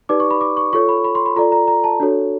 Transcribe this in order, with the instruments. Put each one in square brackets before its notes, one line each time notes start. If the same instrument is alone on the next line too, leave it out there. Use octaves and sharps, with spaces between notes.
[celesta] D#4 G4 B4 D5 D6
C#6
B5
D6
C#6
F4 A4 C#5 C#6
B5
B5
C6
B5
F4 A4 D5 A#5
A#5
A#5
A5
D4 F#4 A4 C#5